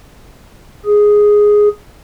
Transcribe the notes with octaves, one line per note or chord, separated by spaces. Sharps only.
G#4